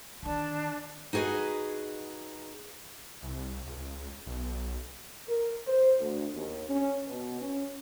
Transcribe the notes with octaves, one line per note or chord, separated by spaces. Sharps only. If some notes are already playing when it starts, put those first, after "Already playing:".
D3 D#3 D4 A5
D#4 F#4 G#4 B4 D#5
C2
C#2
B1
A#4
C5
D2
D#2
C#4
B2
C#4